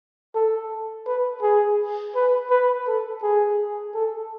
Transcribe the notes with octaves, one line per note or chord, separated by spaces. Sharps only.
A4
B4
G#4
B4
B4
A4
G#4
A4